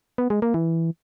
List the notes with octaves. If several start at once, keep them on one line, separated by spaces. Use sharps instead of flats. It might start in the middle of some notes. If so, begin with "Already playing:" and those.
B3
G#3
A#3
E3